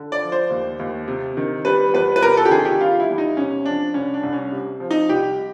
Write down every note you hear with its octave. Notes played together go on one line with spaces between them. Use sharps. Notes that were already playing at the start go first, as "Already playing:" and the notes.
Already playing: D3
D5
F3
C5
D#2
D#2
C3
D#3
G3 B4
E2 B4
B4
C3 A#4
A4
G4
D#3 G#4
G4
G3 F4
E4
E2
D#4
C3 C#4
F3 D4
C2 C#4
D4
C2
C#4
C3
F3
D#4
C2 G4